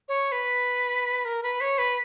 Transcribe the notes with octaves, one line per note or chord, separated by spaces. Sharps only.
C#5
B4
A#4
B4
C#5
B4